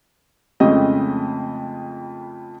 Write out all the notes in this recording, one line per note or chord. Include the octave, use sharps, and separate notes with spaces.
F2 C#3 G#3 A3 D#5 G5